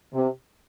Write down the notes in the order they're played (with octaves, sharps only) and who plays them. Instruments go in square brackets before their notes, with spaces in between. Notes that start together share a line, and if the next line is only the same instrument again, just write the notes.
[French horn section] C3